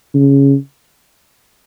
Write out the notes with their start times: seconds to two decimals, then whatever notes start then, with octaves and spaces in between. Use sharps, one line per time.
0.14 C#3